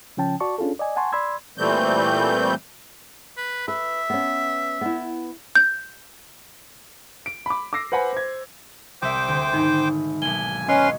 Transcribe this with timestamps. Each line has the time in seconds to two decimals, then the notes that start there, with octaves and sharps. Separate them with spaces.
0.17 C#3 F3 C#4 G5 A5
0.40 F#4 D5 A5 C#6
0.58 C#4 D4 F4 G#4 A4
0.79 D5 D#5 G#5
0.96 F#5 G#5 A5 C6 C#6
1.13 D5 B5 C6 E6 G#6
1.58 A#2 E3 G3 A3 C4 G6
3.37 B4
3.68 B4 E5
4.10 B3 C#4
4.81 B3 E4
5.55 G6
7.26 D7
7.46 B5 D6
7.73 D6 E6 A#6 C7
7.92 B4 C5 F#5 G#5 B5
8.13 C5 G#6
9.02 C2 C5 E5 G5 D6
9.28 D2
9.53 G#1 D#4
10.22 B1 A#3 G#5 G7
10.68 C#4 B4 C#5 D#5 F5 C6